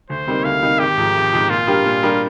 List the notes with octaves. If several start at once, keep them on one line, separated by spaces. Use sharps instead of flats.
D2 C5
C3 G3 A#3 D#4
D2 F5
C3 G3 A#3 D#4
G#1 G4
G#2 F3
G#1
G#2 F3
A#2 F4
G3 D4 G4 A#4
A#2
G3 D4 G4 A#4